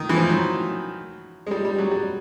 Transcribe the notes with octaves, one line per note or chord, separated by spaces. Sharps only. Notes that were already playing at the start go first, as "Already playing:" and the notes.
Already playing: D#3
E3
F3
F#3
G#3
G3
G3
F#3
G3